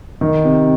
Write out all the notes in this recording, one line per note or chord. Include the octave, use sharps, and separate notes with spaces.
D#3
C3